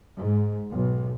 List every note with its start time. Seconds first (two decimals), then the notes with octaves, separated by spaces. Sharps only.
0.16 G#2
0.71 B1